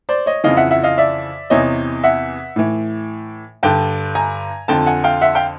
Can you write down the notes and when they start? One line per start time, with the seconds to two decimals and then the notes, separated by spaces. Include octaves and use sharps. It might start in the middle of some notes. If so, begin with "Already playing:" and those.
0.09 C5 D5
0.26 C#5 D#5
0.44 F2 C#3 E3 D#5 F5
0.57 E5 F#5
0.71 E5 F#5
0.83 D#5 F5
0.98 D5 E5
1.50 E2 C3 E3 C#5 D#5
2.03 E5 F#5
2.56 A2 E3
3.63 G2 D3 G5 A5
4.15 G#5 A#5
4.68 F2 D3 G5 A5
4.86 F#5 G#5
5.04 F5 G5
5.21 E5 F#5
5.35 F5 G5